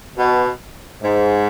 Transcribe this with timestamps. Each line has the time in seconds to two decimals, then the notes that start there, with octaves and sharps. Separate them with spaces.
0.17 B2
1.02 G#2